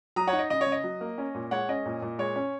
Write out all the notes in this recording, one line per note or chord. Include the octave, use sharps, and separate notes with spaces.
F#3 A#5 D#6
C#5 F#5
D#4
D#5
C#3 D#5
C#5
C#3
D#5
F#3
A#3
C#4
A#2
G#3 C#5 F#5
C#4 D#5
A#2
A#2
G#3 C#5
C#4